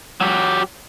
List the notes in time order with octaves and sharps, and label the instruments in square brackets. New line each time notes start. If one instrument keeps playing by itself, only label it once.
[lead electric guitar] F#3 G4